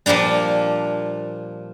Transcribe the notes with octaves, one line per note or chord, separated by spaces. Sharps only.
A#2 F3 G3 A#3 D4